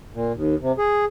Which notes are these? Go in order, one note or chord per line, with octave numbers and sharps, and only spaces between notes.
A#2
D#2
C3
G#4